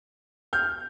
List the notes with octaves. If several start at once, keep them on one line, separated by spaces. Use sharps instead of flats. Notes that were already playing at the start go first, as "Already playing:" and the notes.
F6 G6